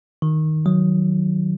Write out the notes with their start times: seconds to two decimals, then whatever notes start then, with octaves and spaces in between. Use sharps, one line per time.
0.22 D#3
0.66 F#3